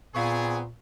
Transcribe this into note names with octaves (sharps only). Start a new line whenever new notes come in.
A#2 B3 C4 G#4 F5 C#6